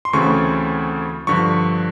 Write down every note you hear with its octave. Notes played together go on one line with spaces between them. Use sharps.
C6
D2 C#3 E3 A3 C4 C#6
G2 D3 F3 C#6